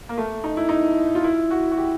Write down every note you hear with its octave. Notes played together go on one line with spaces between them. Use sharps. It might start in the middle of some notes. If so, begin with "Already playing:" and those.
A#3
A3
D#4
E4
D#4
F4
E4
F#4
F#4
G4